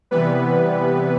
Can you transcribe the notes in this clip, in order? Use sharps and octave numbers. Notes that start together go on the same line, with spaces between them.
C3 E3 G3 B3 B4